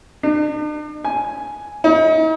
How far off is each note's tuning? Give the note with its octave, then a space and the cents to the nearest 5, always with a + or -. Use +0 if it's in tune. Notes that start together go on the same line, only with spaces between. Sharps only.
D4 +45
G#5 +5
D#4 +40